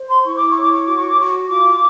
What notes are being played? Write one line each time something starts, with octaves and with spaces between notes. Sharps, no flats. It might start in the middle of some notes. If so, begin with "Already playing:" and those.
Already playing: C5
C6
E4 C#6
D6
C#6
C#5
D6
C#6
F#4 D6
C#6
D6
F#4 C#6
F4 D6